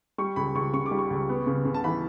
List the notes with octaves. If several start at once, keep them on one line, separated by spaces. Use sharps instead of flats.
G3 C#6
C#2 B5
C#2 C#6
C#3 C#6
D6
G3
C#6
C#2
B3
C#3
C#3
A5
E3 B5